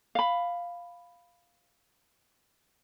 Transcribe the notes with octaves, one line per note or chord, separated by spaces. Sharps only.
F5 B5